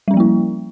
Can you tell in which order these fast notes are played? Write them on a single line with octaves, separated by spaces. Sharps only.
G3 C#4 F3 A#3 E4